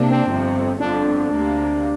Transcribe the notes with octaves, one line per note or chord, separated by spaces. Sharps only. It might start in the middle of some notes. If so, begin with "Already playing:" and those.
Already playing: C3 A#3 D4
C4
G1 F2 C3
G1 F2 D3 D4
D2 C3 A#3